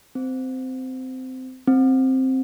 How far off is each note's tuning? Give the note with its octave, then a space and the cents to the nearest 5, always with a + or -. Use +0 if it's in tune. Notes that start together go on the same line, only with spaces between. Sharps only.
C4 -15
C4 +5